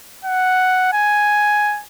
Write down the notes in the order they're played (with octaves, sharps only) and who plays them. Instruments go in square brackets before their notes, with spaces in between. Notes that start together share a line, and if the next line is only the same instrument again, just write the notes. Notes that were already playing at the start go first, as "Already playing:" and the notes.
[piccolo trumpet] F#5
G#5